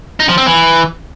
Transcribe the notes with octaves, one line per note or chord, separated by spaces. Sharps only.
D#4
F3
C4
E3